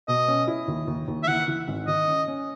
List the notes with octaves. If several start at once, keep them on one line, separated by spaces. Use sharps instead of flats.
B2 D#5
C#4
E4
D#2
D#2
D#2
E5
E3 F#5
E3
G#1
D#3 D#5
C#4
C#4